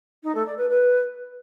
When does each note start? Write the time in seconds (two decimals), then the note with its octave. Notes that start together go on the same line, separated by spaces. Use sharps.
0.23 D#4
0.34 A3
0.46 D5
0.57 B4
0.69 B4